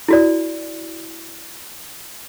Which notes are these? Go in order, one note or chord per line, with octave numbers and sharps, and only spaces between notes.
E4 F#4 D5